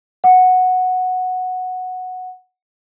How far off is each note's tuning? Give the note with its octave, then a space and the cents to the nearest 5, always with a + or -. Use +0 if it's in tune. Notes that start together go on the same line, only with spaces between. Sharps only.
F#5 -5